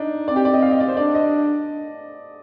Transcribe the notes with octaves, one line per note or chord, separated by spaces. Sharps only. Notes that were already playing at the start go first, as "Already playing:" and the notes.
Already playing: D4 D#4
C4 D5
G4
D5
D#5
F5
D#5
D5
C5
D4 D5
D#5